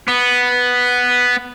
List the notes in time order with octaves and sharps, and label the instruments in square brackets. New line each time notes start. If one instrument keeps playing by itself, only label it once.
[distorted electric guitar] B3